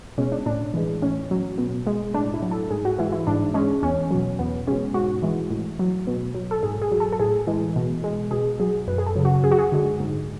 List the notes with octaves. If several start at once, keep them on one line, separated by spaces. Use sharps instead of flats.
B2 G#3 C#4
D4
A2 D4
E3 G#3
A2 C#4
F#3
B2
G#3
A2 D4
E4
F#3
A4
G#2 G#4
F#4
E3 G#3 E4
E4
G#2 D4
G#3 C#4
E2 C#4
B2 F#3
E2 B3
B2 G#3 C#4
G#2 F#4
E3 G#3
A2
F#3
B2
F#3
A4
G#2 G#4
G#4
F#3
A4
A4
A2 G#4
E3 G#3
B2
G#3
B2 G#4
F#3 G#4
F#2 B4
G#4
A4
C#3 F#3
F#4
F#2 G#4
F#4
G#4
D3 G#3
G#2